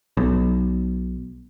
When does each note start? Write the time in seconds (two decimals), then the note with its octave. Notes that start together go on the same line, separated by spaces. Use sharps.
0.17 B1